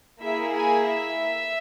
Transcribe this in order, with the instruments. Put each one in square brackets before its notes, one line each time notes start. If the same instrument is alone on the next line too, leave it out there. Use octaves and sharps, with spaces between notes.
[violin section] A#3 E4 G#4 E5
G#5
E5